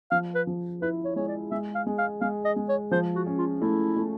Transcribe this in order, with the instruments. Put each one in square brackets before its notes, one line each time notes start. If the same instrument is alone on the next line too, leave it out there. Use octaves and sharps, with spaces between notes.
[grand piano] F3 [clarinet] F5
[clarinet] B4
[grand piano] F3
[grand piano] E4 [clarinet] B4
[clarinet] C#5
[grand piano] G#3 [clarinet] C#5
[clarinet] D5
[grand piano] G#3 [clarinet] E5
[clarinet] F5
[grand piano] G#3
[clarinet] F5
[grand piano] G#3 [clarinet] F5
[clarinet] D#5
[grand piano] G#3
[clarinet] C#5
[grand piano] F3 [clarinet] C5
[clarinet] F#4
[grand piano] C#4
[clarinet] F4
[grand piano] A3 [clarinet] E4
[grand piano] A3